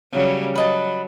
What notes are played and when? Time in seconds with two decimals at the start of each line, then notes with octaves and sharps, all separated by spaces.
0.12 C#3 F#3 G3
0.55 F#3 B4 D#5 A5